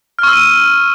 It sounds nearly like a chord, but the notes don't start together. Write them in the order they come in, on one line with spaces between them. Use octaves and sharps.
F6 C#6 E6 D#7